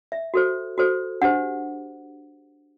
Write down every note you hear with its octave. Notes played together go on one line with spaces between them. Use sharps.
E5
F#4 A4 C5
F#4 A4 C5
D4 G4 C5 F#5